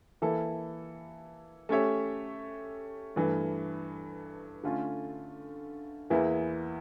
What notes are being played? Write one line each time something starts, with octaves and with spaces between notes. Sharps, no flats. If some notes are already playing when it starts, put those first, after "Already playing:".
E3 A#3 E4 A4
A3 C#4 G4 C#5 E5
G2 E3 A3
D3 A3 C#4 F4
E2 E3 A#3 E4